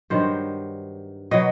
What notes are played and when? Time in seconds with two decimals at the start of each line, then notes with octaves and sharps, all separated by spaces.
0.10 G2 D#3 F#3 C5
1.31 B2 F#3 D#5